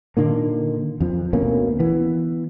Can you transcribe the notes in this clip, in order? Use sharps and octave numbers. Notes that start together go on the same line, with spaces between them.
A#2 D3 D#3 A#3
F2 F3
D2 B2 A#3 C#4
E3 B3